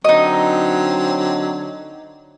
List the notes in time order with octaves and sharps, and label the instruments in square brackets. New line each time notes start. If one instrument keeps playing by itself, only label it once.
[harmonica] D3 F#3 C4 [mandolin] D#4 D#5